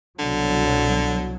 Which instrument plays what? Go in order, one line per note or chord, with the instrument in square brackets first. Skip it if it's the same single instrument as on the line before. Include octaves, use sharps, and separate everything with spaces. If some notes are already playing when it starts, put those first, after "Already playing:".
[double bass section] C2 B2 F#3 [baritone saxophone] D3